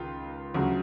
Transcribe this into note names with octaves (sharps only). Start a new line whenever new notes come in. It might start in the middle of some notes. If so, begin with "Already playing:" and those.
Already playing: C#2 D#3 F4
D2 C#3 F#3